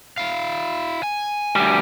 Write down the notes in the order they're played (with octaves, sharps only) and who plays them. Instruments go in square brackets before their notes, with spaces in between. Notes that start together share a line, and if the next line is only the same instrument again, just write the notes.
[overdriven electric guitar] E4 F5
G#5
[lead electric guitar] D2 G3